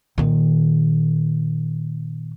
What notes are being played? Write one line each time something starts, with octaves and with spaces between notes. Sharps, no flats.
A#2 D#3